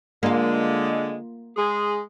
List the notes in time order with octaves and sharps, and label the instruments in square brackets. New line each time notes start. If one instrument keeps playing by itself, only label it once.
[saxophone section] D3 G#3 [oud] A#3 F4
[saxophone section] G#3 G#4